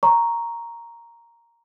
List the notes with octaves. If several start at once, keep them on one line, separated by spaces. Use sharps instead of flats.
C#5 A#5 C#6